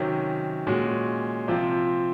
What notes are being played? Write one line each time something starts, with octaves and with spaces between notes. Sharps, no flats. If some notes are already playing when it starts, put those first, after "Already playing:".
Already playing: C3 D#3 F#3 C#4
A#2 G#3 C#4 F#4
C3 F3 C4 F4